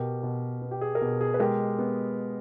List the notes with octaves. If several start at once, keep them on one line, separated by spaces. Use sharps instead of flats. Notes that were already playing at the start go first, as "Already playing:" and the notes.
Already playing: B2 G4 A#4
B2
B3
G4
G#4
A#4
B2 G#4
G#4
B4
G#3 G4 A#4
B3